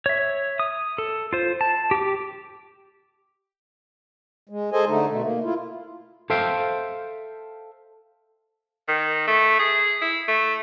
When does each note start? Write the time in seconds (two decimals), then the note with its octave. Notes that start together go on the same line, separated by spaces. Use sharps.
0.06 C#5 E5
0.60 D#6
0.98 A4
1.33 F4 C5
1.61 A5
1.91 G4 D6
4.49 G#3
4.72 G#4 A4 C5 D#5 G#5
4.88 D3 A3 D#4
5.09 B2 A3
5.23 A#3
5.43 E4 F4
6.30 A4 C5 E5 F5 G5
8.88 D#3
9.28 A3
9.60 G#4
10.02 E4
10.28 A3